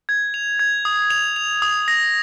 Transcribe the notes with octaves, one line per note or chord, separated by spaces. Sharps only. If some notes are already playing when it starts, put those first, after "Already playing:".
G#6
F7
G#6
D#6
F7
F7
D#6
A#6